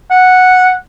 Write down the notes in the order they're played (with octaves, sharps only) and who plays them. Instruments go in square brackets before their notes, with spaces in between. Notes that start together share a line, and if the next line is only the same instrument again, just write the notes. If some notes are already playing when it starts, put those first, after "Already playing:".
[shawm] F#5